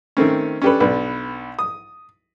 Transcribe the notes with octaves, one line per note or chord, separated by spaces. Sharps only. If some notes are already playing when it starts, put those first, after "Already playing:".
D#3 A3 C4 C#4
C#4 D4 G4 A4 B4
B1 D4 B4
D#6